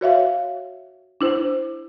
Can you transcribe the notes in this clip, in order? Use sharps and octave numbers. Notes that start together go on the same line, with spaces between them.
F#4 C#5 E5 F5
D4 E4 C5